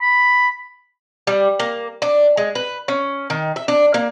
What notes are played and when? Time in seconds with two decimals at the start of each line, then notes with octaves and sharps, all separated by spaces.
0.02 B5
1.27 G3
1.60 A#3
2.02 D4
2.37 G#3
2.55 B4
2.88 C#4
3.30 D#3
3.56 E5
3.68 D4
3.94 A#3